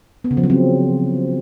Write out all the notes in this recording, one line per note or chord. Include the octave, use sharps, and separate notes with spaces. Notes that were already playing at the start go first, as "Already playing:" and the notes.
B3
C#3
F3
F#3
C4